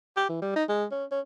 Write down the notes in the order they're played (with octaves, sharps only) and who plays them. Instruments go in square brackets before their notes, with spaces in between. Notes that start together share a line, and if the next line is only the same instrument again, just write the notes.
[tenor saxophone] G4
E3
G3
D#4
G#3
C#4
C#4